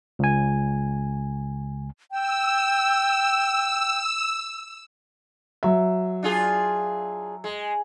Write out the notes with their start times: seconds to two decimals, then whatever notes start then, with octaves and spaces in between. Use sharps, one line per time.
0.19 C#2 G#5
2.11 G5 E6
5.63 F#3 E5
6.23 D4 F4 G#4
7.44 G#3